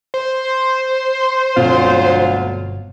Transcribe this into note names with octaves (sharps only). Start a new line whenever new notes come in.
C5
G1 D2 B2 F#3 C4 F4